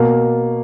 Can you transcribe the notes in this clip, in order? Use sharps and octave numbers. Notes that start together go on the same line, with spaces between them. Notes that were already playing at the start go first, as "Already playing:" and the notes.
Already playing: B2 A#3